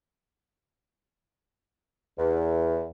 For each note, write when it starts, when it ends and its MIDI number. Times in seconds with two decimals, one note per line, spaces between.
2.18 2.88 40